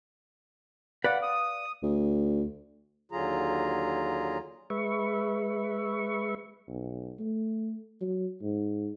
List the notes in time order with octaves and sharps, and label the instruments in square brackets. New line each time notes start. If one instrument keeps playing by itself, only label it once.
[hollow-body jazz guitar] B4 D5 F5 [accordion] F#5
[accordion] D#6
[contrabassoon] D2
[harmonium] D#2 D3 F#3 F4 G#4 A#5
[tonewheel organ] G#3 B4 E5 C#6
[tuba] B1
A3
F#3
G#2